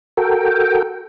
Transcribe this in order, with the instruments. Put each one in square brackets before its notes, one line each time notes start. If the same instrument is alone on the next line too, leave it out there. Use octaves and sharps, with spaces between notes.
[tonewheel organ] F#4 A4 A#4 G5